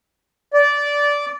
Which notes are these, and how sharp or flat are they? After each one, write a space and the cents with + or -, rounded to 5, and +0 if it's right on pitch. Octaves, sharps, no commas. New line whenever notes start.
D5 -15